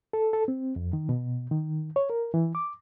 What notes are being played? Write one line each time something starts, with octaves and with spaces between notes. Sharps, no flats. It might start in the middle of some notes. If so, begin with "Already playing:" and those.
A4
A4
C4
F2
D#3
B2
D#3
C#5
A#4
E3
D6